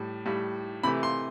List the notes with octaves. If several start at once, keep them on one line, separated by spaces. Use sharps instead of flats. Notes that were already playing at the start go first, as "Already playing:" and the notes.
Already playing: A2 G3
A2 G3
C3 E3 A3 B5
C6